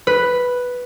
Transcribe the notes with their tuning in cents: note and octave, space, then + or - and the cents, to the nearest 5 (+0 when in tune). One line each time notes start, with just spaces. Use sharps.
B4 +0